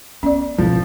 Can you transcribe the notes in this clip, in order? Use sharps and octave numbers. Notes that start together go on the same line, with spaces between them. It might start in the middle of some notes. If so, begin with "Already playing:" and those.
B3 C#4 D5
G#1 B2 F3